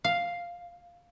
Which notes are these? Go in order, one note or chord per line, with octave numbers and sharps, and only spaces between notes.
F5